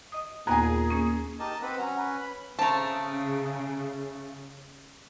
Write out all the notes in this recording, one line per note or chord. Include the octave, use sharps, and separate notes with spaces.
D#5 D#6
D#2 A#2 B3 G#4 G#5 A#5 F#6
A#3 C#4
D#4 G4 A#4 D#5 A5
C4 B4 F#5
F#3 C#4 A#5
B4
B5
C#3 A3 C4 A5 A#5